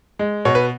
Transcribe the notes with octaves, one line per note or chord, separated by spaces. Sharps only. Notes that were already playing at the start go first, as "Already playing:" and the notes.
G#3
B2 C#5
B4